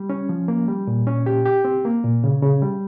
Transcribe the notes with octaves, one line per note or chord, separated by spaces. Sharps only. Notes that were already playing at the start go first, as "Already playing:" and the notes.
Already playing: G3
C#4
F3
A#3
G3
A#2
C#4
G4
G4
C4
A#3
A#2
C#3
C#3
G3